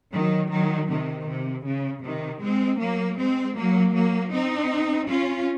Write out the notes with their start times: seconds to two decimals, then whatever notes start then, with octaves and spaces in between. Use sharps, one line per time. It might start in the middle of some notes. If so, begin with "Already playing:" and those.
0.13 D#3 F#3
0.51 D#3 F#3
0.89 C3 D#3
1.28 C3
1.65 C#3
2.03 C3 D#3
2.42 G#3 C4
2.80 F#3 A#3
3.18 G#3 C4
3.56 F#3 A#3
3.94 F#3 A#3
4.32 C4 D#4
5.09 C#4 F4